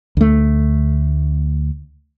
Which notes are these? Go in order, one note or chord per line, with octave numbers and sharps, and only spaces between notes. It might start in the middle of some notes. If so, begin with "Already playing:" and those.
D2 A3